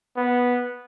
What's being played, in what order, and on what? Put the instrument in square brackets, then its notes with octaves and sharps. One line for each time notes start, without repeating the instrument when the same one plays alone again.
[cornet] B3